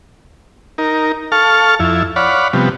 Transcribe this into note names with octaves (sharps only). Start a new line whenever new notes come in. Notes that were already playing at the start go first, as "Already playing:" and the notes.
D#4 A#4
A4 F5 A5 C#6 F6
F2 E4
C#5 D5 F5 F#5 B5
C3 F3 G3 B3